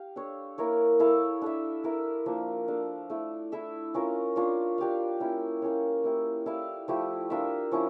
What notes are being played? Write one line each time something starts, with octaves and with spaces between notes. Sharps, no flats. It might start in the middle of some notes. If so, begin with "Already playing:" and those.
Already playing: G4 F5
D4 A4 C#5
A#3 E4 A#4 C#5
E4 A4 C#5 F5
D4 A4 E5
E4 A#4 E5
F3 A#3 D4
D4 A4 D5 F5
A3 E4 A4
E4 A4 E5
C#4 F4 A#4
D4 F4 C#5
D4 G4 C#5 F5
A#3 C#4 E4 G4
A#3 C#4 F4 C#5
A#3 E4 G4
E4 A4 D5 F5
F3 A3 E4 G4
D4 F4 A#4 E5
F3 C#4 E4